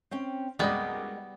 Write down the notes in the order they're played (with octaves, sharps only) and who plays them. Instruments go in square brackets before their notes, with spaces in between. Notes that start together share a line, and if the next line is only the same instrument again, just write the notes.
[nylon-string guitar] C4 C#4 G5
[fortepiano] C2 F#2 D5 [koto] G3 B3 [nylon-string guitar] G#3 A#4 D#5